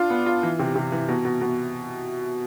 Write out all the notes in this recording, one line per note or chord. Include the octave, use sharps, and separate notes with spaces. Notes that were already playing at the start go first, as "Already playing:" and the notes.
Already playing: D4 F4
B3
F4
E3
C3
C3
E3
B2
B2
B2